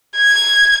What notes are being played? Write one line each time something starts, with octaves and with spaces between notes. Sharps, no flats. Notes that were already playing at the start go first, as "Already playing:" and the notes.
G#6